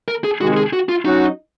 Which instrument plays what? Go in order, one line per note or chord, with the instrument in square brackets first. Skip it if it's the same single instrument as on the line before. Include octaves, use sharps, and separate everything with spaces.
[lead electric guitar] A#4
G#4
[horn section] C3 D#3 G#3 [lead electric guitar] F#4
[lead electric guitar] G#4
F#4
F4
[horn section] F#3 C#4 F#4 [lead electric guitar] D#4